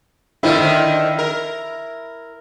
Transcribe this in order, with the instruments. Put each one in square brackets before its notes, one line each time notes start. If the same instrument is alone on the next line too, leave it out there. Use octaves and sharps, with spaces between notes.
[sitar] D3 D#3 F3 [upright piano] E4
[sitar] A#4